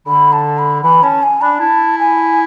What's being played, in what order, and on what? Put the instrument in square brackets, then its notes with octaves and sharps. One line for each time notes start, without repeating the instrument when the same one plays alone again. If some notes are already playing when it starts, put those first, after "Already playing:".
[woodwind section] D3 [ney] B5
[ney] A5
B5
[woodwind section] E3 [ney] B5
[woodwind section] C#4 [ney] A5
[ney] G#5
[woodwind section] D4 [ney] B5
[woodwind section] E4 [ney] A5
[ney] G#5